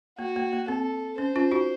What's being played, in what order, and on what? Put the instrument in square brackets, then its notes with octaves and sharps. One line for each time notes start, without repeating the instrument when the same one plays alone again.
[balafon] A#3 [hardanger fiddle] F#4
[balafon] A#3
A#3
[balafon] C4 [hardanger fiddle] A4
[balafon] C#4 [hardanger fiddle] C5
[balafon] C#4 F4
D#4 F#4